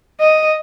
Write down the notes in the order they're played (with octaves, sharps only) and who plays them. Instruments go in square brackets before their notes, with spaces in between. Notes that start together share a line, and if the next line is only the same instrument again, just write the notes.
[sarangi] D#5